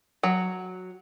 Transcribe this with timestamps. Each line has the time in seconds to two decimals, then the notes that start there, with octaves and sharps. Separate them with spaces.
0.23 F#3